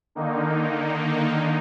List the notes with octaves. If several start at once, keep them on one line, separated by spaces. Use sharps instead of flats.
D3 D#3 A#3 D#4